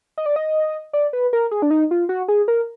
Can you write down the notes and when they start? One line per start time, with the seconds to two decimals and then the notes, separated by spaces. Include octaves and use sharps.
0.18 D#5
0.26 D5
0.36 D#5
0.93 D5
1.13 B4
1.33 A#4
1.51 G#4
1.62 D4
1.71 D#4
1.91 F4
2.09 F#4
2.28 G#4
2.48 A#4